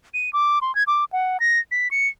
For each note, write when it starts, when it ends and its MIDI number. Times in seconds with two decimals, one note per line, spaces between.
0.14 0.30 99
0.33 0.59 86
0.62 0.74 84
0.75 0.83 92
0.87 1.04 86
1.13 1.37 78
1.40 1.59 94
1.71 1.88 95
1.91 2.08 97